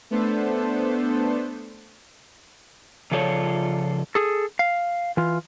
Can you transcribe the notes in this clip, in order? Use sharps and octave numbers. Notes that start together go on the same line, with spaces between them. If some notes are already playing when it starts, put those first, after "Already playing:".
A3 B3 D4 A4 C5
C#3 F3 F4 A4 C#5 D5
G#4 A4
F5
E3 F4